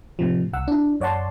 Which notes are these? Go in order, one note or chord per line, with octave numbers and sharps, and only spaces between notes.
A2 C3 F3
C2 F#5 E6
D4 E4
F#2 C#5 D5 F#5 A5 C6